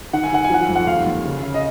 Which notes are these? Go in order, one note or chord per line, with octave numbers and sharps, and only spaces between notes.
D#3 F#5
G#5
D#3 F#5
G#5
F3 F#5
F2
F#5
D#2 F5
D#2
C#3
C#3
D#5